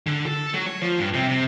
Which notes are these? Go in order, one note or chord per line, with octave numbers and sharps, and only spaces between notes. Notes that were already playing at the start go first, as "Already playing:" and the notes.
D3
A4
F#3
C#5
F3
G2
C3
C3